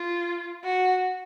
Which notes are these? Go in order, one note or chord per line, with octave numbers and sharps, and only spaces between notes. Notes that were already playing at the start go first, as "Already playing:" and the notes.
Already playing: F4
F#4